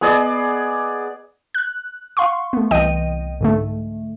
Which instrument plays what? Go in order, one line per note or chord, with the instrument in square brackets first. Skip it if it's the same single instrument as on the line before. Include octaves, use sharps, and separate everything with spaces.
[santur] B3 G#4 D5 D#5
[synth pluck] F#6
F5 F#5 C6 C#6
A3 B3
C2 E3 D#5 G5 D#7
G#2 D3 A3